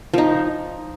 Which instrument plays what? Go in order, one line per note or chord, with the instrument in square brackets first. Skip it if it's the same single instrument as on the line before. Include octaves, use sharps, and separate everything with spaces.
[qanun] F3 D#4